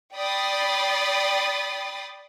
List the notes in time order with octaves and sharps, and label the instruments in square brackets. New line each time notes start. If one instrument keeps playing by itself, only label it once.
[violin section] D5 G5 B5 D#6 A6 C7